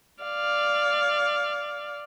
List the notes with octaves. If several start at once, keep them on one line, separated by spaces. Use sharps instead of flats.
D5 F5